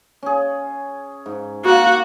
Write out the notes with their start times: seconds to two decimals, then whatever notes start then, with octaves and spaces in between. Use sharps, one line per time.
0.23 C#4 G#4
1.26 G#2
1.65 A#3 F#4